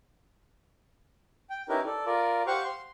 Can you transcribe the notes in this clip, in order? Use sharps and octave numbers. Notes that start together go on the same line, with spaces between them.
G5
C#4 D#4 E4 G4 A#4 B4
A4 D5
F4 A#4 D5
G4 C5 F5 F#5 C#6
C6